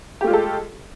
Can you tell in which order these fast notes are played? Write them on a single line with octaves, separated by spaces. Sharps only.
G4 A3 F4 G#3 A4